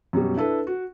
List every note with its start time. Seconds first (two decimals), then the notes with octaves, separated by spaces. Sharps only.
0.13 F#2 B2 G3
0.36 D4 E4 A4 B4
0.67 F#4